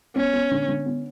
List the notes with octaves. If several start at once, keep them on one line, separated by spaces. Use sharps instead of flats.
B3 C#4
B3
D3
D3
B3